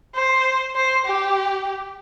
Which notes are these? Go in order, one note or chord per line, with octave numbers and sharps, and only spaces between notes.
C5
C5
G4